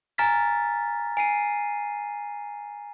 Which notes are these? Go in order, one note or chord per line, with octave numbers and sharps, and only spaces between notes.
G#5 A#5 F6 A6 B6
G#5 C7 D#7